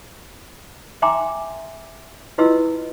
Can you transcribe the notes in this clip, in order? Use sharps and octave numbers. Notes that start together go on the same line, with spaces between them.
E5 G5 G#5 A#5 C6 D6
E4 F4 B4 D#5 C6 E6